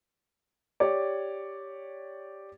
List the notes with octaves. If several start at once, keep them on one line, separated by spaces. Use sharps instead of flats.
G4 C#5 D5